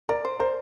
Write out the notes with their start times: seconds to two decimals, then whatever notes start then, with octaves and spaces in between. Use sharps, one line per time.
0.09 A#4 D5
0.25 C5
0.39 A#4 C5